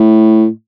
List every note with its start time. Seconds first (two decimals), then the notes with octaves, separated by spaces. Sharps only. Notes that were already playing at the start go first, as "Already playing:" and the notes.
Already playing: A2